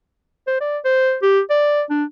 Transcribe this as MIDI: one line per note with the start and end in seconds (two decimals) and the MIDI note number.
0.47 0.59 72
0.61 0.78 74
0.85 1.17 72
1.22 1.40 67
1.50 1.82 74
1.90 2.04 62